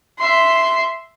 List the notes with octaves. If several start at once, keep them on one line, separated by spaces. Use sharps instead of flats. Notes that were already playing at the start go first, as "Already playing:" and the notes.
E5 C6